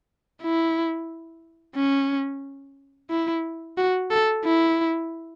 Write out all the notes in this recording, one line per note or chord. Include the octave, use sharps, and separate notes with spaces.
E4
C#4
E4
F#4
A4
E4